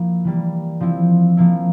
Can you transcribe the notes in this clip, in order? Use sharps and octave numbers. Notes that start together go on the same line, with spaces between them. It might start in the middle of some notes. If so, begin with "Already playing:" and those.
Already playing: F3 A#3 E4
E3 G3 A#3
F3 C4 E4
F3 A#3 E4